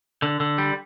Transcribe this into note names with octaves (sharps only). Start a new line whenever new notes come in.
D3
D3
G3